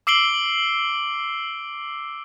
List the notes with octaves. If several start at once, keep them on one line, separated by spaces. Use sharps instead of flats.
D6 E6 C7 D7 F#7 G7